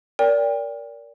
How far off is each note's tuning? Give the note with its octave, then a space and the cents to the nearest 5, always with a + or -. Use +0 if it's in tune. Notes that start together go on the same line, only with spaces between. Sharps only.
A#4 +0 D5 -25 G5 +25